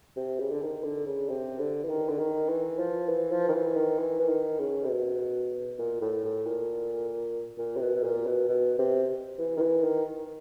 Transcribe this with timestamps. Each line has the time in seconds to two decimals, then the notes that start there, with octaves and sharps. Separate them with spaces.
0.17 C3
0.40 C#3
0.51 D3
0.62 D#3
0.84 D3
1.06 C#3
1.29 C3
1.59 D3
1.83 E3
1.89 D#3
2.09 D3
2.19 D#3
2.49 E3
2.79 F3
3.09 E3
3.32 F3
3.48 D#3
3.54 E3
3.76 D#3
3.99 E3
4.19 E3
4.29 D#3
4.59 C#3
4.85 C3
4.89 B2
5.79 A#2
6.01 A2
6.24 A2
6.46 A#2
7.58 A#2
7.77 C3
7.81 B2
7.96 B2
8.03 A#2
8.26 B2
8.49 B2
8.78 C3
9.39 E3
9.57 D#3
9.61 E3
9.83 D#3